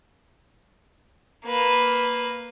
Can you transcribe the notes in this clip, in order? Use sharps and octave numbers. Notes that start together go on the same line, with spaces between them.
A#3 B4